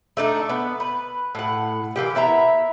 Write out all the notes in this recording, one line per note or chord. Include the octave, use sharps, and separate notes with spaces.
A3 D4 D#4
B3
B4
A2 F#5
E3 F#3 A#3 G4
B3 E4 E5 A#5